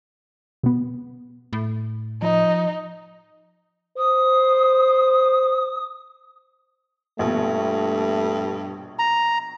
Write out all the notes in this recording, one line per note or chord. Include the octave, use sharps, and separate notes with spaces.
B2 B3
A2
F3 D#4
C5 D#6
A#1 G2 B2 A3
A#5